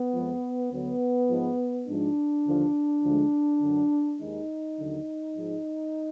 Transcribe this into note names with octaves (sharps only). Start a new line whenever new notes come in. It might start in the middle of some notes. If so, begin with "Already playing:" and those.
Already playing: B3
F2 F3 G#3
D2 D3 F#3 B3
G#2 F3 G#3
G#2 F3 G#3 D4
D#2 D3 F3
D2 D3 F3 G#3
F#2 D3 F#3
D#2 D#3 G#3 D#4
D#2 D3 F#3
G#2 F3 G#3